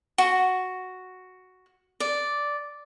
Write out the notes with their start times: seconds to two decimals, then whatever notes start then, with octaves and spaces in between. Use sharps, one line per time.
0.18 F#4
2.00 D5